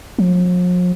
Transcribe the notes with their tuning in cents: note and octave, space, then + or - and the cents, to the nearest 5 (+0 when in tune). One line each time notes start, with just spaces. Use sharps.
F3 +45